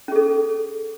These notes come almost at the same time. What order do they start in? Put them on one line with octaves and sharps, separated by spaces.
C#4 G#4 A4